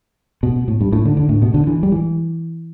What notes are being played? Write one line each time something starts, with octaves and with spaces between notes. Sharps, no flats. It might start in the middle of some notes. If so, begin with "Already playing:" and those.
B2
A2
G2
A2
D3
D3
A2
B2
D3
E3
G3
E3